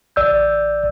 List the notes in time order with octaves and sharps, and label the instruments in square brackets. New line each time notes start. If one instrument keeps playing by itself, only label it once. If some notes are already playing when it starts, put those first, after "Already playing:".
[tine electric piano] A1 D5 E6 G6